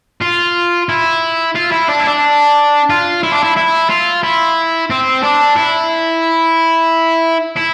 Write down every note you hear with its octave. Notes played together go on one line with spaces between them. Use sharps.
F4
E4
F4
E4
D4
E4
D4
F4
E4
D4
E4
E4
F4
E4
C4
D4
E4
E4